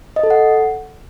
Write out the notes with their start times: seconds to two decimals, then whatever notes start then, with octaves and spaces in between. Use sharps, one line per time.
0.16 D#5
0.23 A4
0.30 F#5